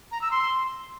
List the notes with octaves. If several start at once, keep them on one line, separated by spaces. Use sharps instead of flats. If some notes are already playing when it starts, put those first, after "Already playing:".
A#5
E6
C6